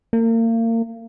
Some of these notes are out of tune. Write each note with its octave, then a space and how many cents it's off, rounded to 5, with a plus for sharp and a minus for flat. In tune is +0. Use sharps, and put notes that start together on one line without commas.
A#3 -35